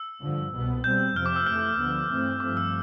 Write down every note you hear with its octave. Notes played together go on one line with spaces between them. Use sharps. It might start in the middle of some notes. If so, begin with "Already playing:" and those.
Already playing: E6
G2 D3 F3
C2 B2 B3
B2 G3 C4 G6
F2 C3 F3 C4 F6
D6
E6
F2 E3 A3 F6
D2 D3 F3 B3
G2 E3 A3 C4
G2 F3 A3 C4 D6
E6